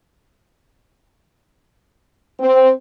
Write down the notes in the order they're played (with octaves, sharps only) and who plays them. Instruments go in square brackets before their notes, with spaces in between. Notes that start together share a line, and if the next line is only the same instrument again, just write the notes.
[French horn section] C4